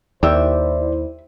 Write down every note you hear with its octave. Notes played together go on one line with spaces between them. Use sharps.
D#2 E4 G4 C5 D5 E5